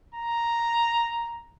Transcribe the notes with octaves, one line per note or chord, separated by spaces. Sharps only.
A#5